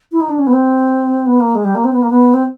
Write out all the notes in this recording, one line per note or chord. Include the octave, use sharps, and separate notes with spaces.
E4
D#4
D4
C#4
B3
C4
B3
A#3
G#3
G3
A#3
C4
B3
A#3
B3
C4